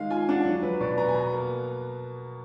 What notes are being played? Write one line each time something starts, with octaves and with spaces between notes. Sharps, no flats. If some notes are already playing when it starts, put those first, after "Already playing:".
Already playing: D#3 G#3 F5
F4 G#5
D4 F#5
F#3
F#3 B4
B2 D5
B3 A#5
G#5
B2 A#5
A#3